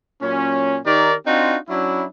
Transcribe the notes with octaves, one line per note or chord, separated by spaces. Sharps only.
A#2 F#3 C#4
D#3 D#4 G4 A#4 D5
C4 D4 D#4 F4 F#4
F#3 C#4 D4 E4